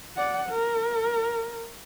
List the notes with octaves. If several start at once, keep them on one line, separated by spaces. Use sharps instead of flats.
D5 F#5
A#4